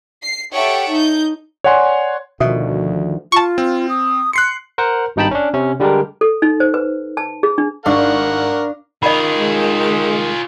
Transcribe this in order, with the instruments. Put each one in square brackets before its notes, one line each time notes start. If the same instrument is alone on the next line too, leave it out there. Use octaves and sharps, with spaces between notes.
[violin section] C7
G4 A4 C#5 E5 F#5 G5
D#4 G6
[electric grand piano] C#5 D5 F#5 G#5 C6
[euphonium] D2 [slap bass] B2 [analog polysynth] D#3 F3 [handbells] E5 D#6
[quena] F4 [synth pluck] A5 C#6
[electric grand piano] C4
[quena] D#6
[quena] C6 [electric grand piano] F#6 C7 C#7
[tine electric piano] A#4 C5 F#5
G#1 G2 D#4 G5 A5 B5
C#4 D4
C3 C#4
D3 G3 G#3 D4 G4 A#4
[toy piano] A4
D#4
C5
B4
A5
G#4
D4
[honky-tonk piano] G#1 [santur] D4 F5 C#6 [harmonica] A#4 F#5
[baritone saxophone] D#3 [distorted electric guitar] F4 G#4 [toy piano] D#5 B5
[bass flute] G#3